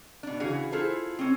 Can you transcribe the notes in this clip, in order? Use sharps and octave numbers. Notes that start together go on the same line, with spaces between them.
B2 D4
C#3 E3 F#4 G#4
E4 F4 G#4 A4 C5
C4 C#4